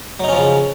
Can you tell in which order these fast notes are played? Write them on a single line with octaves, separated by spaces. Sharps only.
F#3 D#4 C#4 F3 C#3